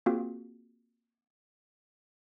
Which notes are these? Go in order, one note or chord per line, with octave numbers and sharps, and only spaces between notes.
A#3 C4 F4 F#4 G#4